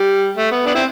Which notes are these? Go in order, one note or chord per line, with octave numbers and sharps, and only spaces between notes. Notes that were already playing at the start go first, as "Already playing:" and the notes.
Already playing: G3
A3
B3
B3 D4
C4 E4